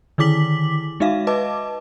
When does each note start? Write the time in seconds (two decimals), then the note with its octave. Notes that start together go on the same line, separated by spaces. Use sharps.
0.18 D3 D#3 E4 D6 B6 F#7
1.00 G#3 D#4 F#4 E5 F5
1.27 B4 D#5 A5 D6